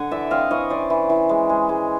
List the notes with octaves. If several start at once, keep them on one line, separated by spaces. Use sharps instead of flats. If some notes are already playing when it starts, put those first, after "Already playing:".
Already playing: D3 F#5 G#5
E3 D5 E5
C4 D#5 F5
E3 C#5 D#5
C#4 C5 D5
E3
E3
G#3
G#3
G#3